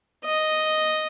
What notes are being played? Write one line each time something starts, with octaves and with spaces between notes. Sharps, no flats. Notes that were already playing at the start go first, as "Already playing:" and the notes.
D#5